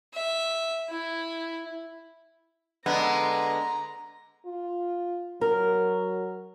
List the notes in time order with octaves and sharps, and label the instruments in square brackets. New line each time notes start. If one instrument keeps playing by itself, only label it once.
[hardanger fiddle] E5
E4
[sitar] D3 G#3 B3 [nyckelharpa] A#5
[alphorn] F4
[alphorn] F#3 [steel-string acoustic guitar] A#4